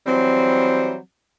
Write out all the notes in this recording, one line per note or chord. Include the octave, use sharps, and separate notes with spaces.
E3 F#3 G3 C4